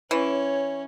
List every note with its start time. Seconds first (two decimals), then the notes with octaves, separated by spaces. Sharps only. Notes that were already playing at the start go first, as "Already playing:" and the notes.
0.11 E3 C#4 C#5